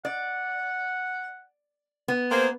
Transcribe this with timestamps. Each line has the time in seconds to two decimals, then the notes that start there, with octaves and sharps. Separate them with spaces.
0.05 D5 F#5
2.08 B3
2.31 A#3 G#4 C5